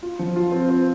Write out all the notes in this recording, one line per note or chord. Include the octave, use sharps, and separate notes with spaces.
F4
F3
F4
C4
C4